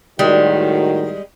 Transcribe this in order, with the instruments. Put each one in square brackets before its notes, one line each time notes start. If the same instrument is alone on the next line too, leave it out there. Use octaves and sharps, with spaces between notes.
[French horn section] A2 D#3 F#4 [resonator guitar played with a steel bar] G3 G#3